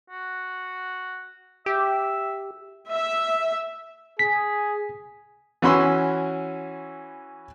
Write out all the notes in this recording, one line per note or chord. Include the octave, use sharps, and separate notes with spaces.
F#4
G4 E5
E5
G#4 B6
E3 C#4 F#4 B5 C6 E6